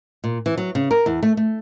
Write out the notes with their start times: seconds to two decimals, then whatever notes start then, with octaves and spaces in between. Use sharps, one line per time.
0.24 A#2
0.46 E3
0.58 F#3
0.75 C#3
0.91 A#4
1.06 E2
1.23 A3
1.37 A3